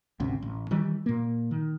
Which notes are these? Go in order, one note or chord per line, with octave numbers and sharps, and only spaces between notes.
G#1 D2 C3 C#4
A1
D#3 E3 G3
A#2 A#3
D#3